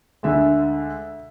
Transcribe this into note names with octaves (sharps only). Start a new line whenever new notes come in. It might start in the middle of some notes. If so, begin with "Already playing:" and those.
D2 D3 G#3 E5